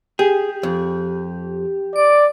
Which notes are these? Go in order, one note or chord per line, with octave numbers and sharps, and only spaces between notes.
G4 G#4
F2
D5 D7